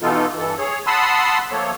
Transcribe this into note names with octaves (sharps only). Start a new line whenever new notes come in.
B2 E3 B3 D#4 F4 A4
G2 E3 A4
G#4 C#5
F#5 A5 B5 C6 D#6 E6
F3 A3 A#3 A4 C#5